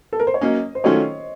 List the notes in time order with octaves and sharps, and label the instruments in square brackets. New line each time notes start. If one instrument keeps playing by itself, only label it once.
[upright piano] A4
A#4
C5
C#5
[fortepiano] F#3 A#3 C#4 [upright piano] D#5
[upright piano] C5
[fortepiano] D#3 F#3 A3 C#4 F4 [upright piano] C#5